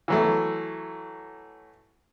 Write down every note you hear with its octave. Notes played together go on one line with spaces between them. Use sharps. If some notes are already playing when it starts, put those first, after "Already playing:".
E3 F#3 A3